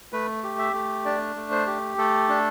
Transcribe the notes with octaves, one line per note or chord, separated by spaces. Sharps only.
A3 B4
G4
E5
A3
D4 D5
A3
C5
G4
A3 A4
D4